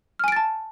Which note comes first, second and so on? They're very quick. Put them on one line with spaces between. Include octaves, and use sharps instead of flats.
F6 G#5 D7 A6 A5